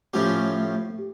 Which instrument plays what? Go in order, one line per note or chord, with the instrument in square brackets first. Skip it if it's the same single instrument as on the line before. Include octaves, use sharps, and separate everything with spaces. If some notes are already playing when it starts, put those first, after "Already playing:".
[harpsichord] A2 F3 C#4 G4 [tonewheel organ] A3
[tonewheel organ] G4